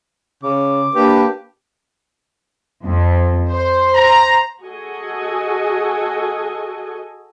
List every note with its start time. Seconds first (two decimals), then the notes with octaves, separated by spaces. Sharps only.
0.43 C#3 D6
0.95 A#3 D4 G4 B4
2.84 F2
3.50 C5
3.94 A#5
4.62 F#4 G#4 A4 D#5 G#5